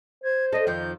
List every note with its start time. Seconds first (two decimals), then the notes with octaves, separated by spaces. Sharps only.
0.24 C5 G#6
0.52 D4 A4 D#5
0.67 F2 D#3 F3 G6